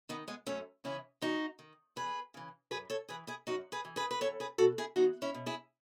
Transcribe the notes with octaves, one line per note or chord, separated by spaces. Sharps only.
D#3 B3 D#4
G#3 B3
F#2 A3 C#4
C#3 E3 C#4 E4
E2 D#4 F#4
D#3
E2 G#4 B4
C#3 E3
F#2 G#4 B4
A4 C#5
E3 G#4 B4
E4 G#4
F#2 D#4 F#4
G#4 B4
E3
G#4 B4
B4
E2 A4 C#5
G#4 B4
B2 F#4 A4
E4 G#4
E2 D#4 F#4
C#4 E4
B2
E4 G#4